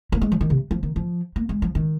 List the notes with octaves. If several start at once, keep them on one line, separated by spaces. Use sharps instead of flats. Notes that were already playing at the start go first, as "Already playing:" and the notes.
A#3
G#3
F3
D#3
C3
F3
D#3
F3
A#3
G#3
F3
D#3